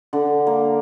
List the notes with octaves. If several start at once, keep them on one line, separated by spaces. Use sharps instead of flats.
D3
A#3